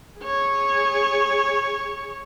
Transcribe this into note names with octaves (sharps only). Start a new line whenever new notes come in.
G#4 C#5